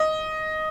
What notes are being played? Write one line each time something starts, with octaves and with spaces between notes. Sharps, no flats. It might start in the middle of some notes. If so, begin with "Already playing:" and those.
Already playing: D#5